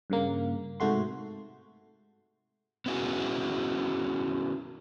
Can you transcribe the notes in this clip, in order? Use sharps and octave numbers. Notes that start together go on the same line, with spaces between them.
G2 C#3 A#3
G#2 C3 A3 F#4 C6
B3 C#4 E4 F#4 G#4